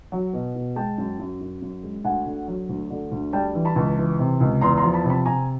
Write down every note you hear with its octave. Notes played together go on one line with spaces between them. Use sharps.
F#3
B2
B2
G#3 G5 A5
F#2
F#2
F#2
F#2
G#3
D2 F#5 G#5
D3
F#3
D2
D3
D2
G3 G5 A5
E3
A5 B5
C#2
E3
C3
C#2
E2 A#5 C6
A#5 C6
F3
A5 B5
C3
A5 B5
C3 G#5 A#5